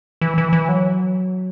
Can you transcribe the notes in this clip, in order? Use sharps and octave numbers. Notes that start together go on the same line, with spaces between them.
E3
E3
E3
F#3